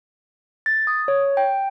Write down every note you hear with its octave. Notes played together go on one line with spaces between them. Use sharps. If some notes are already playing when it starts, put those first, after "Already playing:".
A6
D#6
C#5
G5